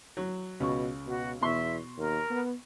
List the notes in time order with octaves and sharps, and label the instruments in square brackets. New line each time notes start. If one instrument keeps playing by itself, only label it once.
[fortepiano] F#3
[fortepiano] C#2 C#6 [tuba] B2
[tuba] B2 [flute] F#4
[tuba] E2 [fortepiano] B2 C6 C#6 [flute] E5
[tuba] D#2 [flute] A#4
[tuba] B3